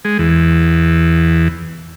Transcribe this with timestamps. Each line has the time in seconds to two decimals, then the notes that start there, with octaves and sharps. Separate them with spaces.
0.05 G#3
0.19 E2